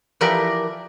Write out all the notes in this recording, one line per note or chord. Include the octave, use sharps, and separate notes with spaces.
E3 F3 G4 A#4 B4 D5